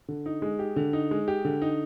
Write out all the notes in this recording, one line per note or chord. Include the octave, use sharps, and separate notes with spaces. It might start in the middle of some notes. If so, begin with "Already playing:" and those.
D3
D#4
G#3
G4
D3
D#4
G#3
G4
D3
D#4